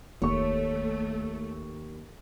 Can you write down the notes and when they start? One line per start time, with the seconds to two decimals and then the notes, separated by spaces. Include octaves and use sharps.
0.22 F1 D#2 A3 C#5 C#6